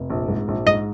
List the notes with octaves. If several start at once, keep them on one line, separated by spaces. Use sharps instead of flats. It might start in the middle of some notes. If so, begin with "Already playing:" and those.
Already playing: F1
A#1
G#2
A#1
G#2 D#5